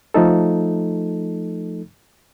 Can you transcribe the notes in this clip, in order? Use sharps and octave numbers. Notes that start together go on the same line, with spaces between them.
F3 A3 D#4 A4